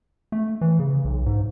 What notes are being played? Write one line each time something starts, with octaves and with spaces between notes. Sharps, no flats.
A3
E3
C#3
B1
G#2